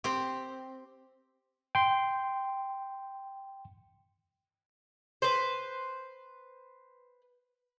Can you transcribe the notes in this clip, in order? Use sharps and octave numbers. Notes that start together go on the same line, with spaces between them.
C4 G4
G5 C6
B4 C5